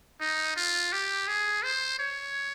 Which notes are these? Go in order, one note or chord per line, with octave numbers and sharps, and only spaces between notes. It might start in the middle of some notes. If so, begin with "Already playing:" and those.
D#4
F4
G4
G#4
C5
C#5